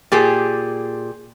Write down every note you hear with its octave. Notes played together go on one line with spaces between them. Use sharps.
A#2 G4 G#4